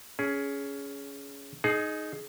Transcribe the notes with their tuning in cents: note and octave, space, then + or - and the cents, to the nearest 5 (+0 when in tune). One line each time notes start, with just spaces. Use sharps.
C#4 +15 G#4 +10
D#4 -5 G#4 +20